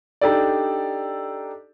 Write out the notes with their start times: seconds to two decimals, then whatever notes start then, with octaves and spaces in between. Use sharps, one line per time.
0.21 D4 D#4 G4 A4 D5